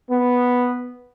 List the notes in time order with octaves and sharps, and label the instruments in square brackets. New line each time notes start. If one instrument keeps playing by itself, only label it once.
[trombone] B3